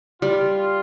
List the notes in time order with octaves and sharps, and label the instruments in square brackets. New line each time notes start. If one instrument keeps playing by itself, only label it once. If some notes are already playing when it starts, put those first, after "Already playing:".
[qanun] G3 [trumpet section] F4